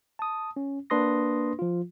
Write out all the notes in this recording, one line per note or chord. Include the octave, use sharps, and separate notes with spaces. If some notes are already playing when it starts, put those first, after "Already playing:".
A5 D#6
C#4
A#3 D4 B4 C6 D#6 A#6
F3 F4